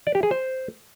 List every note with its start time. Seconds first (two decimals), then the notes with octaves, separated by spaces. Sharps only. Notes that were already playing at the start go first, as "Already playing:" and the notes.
0.07 D5
0.15 G4
0.23 G#4
0.31 C5